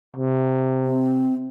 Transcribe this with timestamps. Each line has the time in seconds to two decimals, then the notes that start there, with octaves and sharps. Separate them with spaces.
0.16 C3
0.85 C4